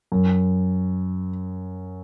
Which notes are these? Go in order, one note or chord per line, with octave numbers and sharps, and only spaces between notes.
F#2